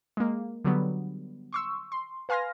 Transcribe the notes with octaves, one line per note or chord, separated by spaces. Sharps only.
G#3 A#3
D3 F#3 G3 B3
C6 C#6 E6
C6
B4 F5 G#5 C6 F6 A#6